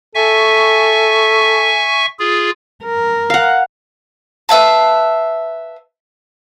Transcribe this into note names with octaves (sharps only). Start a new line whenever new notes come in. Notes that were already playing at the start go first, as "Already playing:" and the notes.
A4 E5 G#5 C#6
F4 G#4
A#4
F5 F#5
B4 E5 F5 A5